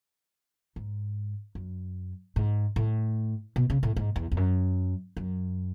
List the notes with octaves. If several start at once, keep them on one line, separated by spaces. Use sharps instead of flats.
G#2
F#2
G#2
A2
B2
C#3
A2
G#2
E2
E2
F#2
F#2